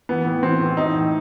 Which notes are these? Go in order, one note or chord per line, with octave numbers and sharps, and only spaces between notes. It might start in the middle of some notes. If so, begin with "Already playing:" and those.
E3 B3
A2
E3 C4
A2
E3 D#4
A2